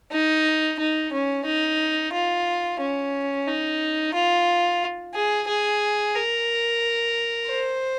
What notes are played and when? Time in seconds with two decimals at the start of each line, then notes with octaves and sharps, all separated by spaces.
0.12 D#4
0.79 D#4
1.12 C#4
1.45 D#4
2.13 F4
2.80 C#4
3.47 D#4
4.14 F4
5.15 G#4
5.48 G#4
6.15 A#4
7.49 C5